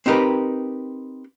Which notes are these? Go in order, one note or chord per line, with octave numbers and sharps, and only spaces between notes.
C4 D#4 G4 A#4 B4